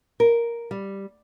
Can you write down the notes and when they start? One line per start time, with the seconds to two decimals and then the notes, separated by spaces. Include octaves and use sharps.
0.20 A#4
0.71 G3